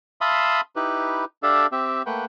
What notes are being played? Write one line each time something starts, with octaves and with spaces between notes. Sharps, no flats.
E5 F5 A5 B5 C6 D#6
D#4 E4 G4 B4
D4 G4 A4 D5 E5 F5
C4 G4 E5
A3 A#3 B4 F#5 G5